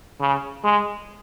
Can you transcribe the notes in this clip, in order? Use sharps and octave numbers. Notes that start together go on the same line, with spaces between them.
C#3
G#3